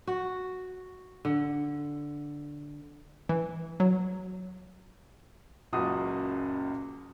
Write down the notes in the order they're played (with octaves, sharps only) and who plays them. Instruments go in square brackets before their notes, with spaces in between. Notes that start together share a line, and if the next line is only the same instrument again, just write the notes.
[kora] F#4
D3
[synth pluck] E3
F#3
[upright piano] F#1 C#2 A#2 F#4 D#6